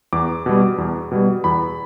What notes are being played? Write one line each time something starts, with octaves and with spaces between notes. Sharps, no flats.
E2 D6
B2 G3
E2
B2 G3
E2 B5